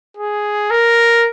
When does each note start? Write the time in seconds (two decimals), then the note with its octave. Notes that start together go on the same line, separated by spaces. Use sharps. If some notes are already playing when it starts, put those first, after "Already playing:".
0.17 G#4
0.71 A#4